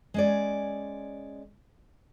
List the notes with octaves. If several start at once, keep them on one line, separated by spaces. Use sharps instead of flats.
G#3 C#4 D5